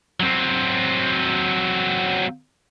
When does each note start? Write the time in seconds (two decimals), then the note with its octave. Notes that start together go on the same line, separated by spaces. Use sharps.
0.20 F#3 C4